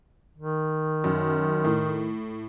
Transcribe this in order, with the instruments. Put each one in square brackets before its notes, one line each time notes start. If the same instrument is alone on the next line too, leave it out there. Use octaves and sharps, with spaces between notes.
[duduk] D#3
[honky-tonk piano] F#2
A2